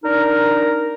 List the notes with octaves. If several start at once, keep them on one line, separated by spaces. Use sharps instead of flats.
D4 D#4 A#4